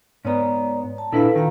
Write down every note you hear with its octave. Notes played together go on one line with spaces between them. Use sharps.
G#2 B3 C#5 D5 A#5
A5
A#2 D4 E4 A4 B4 F5
D#3 F4 F5 A#5